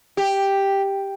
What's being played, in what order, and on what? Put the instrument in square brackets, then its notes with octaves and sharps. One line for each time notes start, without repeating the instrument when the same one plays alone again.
[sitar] G4